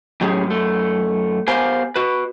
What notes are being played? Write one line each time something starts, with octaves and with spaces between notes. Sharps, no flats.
A2 F#3 C#4 G4 G#4
F#2 A3
B3 G4 A#4 C5 F5 G#5
F#4 B4